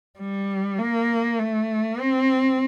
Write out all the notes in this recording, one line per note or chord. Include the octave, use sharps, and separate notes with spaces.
G3
A#3
A3
C4